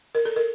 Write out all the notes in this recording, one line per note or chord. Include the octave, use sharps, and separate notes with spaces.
A#4
A4
A#4